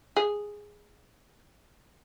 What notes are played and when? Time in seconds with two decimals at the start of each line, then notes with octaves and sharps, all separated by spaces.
0.17 G#4